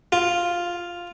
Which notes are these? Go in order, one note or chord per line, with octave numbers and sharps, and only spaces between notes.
F4